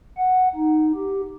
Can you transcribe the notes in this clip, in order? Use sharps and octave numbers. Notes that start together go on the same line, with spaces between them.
F#5
D#4
G4